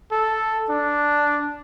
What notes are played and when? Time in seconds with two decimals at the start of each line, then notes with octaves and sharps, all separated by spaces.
0.12 A4
0.70 D4